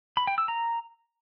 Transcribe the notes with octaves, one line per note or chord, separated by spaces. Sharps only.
B5
G5
E6
A#5